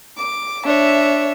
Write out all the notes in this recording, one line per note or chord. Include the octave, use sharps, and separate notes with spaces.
D6
D4 C#5 E5